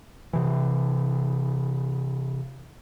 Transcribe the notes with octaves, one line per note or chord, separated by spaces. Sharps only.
C3 E3